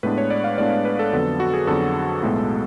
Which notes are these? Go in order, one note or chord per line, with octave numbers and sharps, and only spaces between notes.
A2 G#3 B3 D4 B4
C#5
D5
F5
A2 G#3 B3 D4 D5
B4
A4
F2 D3 F#3 B3
F#4
G#4
F2 D3 F#3 B3 A4
B1 A2 G#3 B3